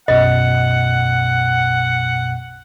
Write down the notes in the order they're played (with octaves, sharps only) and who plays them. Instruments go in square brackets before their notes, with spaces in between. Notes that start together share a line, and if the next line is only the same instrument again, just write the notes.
[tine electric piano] B1 F#2 B2 [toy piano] D#5 [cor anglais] F#5